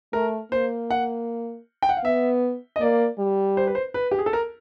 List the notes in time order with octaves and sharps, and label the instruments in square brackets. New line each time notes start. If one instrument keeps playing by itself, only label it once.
[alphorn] A3 [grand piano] A#4
[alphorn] A#3 [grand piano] C5
[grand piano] F#5
G5
F#5
F5
[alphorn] B3 [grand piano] E5
[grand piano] D#5
[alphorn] A#3 [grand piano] D5
[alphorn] G3
[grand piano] C5
B4
C5
B4
G4
G#4
A4
A#4